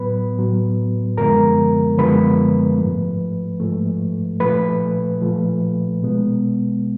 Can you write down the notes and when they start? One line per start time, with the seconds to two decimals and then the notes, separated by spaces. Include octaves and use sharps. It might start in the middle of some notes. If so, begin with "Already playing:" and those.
Already playing: A2 F#3 B3 B4 B5
0.37 A2 F#3 B3
1.17 F#2 D3 F3 G#3 B3 A#4 A#5
1.98 F#2 D3 F3 G#3 B3 B4 B5
2.79 G#2 F3 A3
3.60 G#2 F3 A3
4.40 A#2 F3 A3 B4 B5
5.21 A#2 F3 A3
6.02 B2 G#3 B3